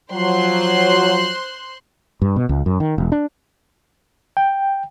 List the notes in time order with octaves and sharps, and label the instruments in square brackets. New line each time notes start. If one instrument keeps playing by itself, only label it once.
[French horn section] F3 F#3 [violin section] C5 C6 F#6
[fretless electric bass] G2
B2
C#2
F#2
D#3
E1
D4
[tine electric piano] G5